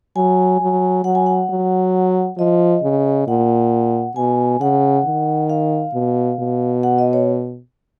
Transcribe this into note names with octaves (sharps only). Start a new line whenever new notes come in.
F#3 G#5
F#3
F#3 F#5
G#5
F#5
F#3
F3 D#5
C#3
A#2 F#5
B2 G#5
C#3 F#5
D#3
F5
B2
B2
F#5
D#5
C#5